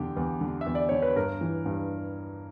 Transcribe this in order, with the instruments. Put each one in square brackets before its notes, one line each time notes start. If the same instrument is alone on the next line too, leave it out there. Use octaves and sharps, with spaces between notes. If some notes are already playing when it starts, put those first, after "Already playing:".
Already playing: [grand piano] E2 D3 G4
E2
D3
E5
E2
D5
D3 C#5
B4
G2 A#4
E3
G2